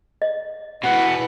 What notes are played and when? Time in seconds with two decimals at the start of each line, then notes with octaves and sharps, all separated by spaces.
0.22 D#5
0.83 E2 B2 E4 B4 F#5